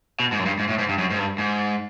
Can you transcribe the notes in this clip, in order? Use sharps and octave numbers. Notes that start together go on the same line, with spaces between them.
B2
G#2
F#2
G2
G#2
A2
G#2
G2
F#2
G#2
G2
G#2